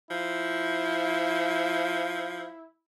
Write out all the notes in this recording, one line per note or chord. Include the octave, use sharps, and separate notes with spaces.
F3 E4